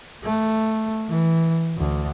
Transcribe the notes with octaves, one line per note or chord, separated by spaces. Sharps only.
A3
E3
D2